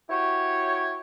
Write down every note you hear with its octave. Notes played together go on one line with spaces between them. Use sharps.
E4 F#4 G4 C#5